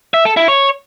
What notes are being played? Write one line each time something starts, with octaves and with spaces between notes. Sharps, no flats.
E5
A4
E4
C#5